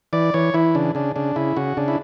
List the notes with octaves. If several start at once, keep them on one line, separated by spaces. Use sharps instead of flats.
E3 D5
E3 C#5
E3 E4
C#3 D4
C#3 D4
C#3 D4
C#3 E4
C#3 F#4
C#3 D4
E4